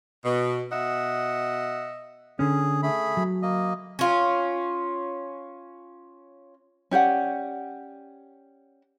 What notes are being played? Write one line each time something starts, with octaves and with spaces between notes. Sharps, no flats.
B2
B2 D#5 E5 F#5
D3 C#4 G#4
A3 G#4 B5
F#3
A#3 D#5
C#4 F4
C#4 G4 D5 F#5